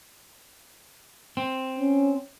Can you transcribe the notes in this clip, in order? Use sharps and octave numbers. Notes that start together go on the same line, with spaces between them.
C4
C#4